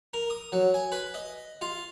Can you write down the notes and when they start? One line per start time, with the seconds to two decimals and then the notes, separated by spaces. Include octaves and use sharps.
0.14 A#4
0.30 D#6
0.52 F#3
0.74 G#5
0.92 B4
1.14 D#5
1.61 F4